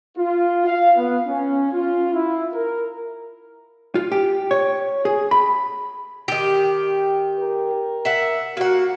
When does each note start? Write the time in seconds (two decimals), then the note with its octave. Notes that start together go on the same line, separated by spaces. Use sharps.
0.17 F4
0.66 F5
0.96 B3
1.26 C#4
1.72 F4
2.13 E4
2.53 A#4
3.95 F4
4.12 G4
4.51 C#5
5.05 G#4
5.31 B5
6.28 D#3 G4
7.38 A#4
8.05 E5 F#5
8.57 A#3 F#4 F#5